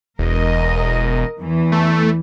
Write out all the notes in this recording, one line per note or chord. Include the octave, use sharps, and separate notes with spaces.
E1 A#4 D#5
E2 E3
A3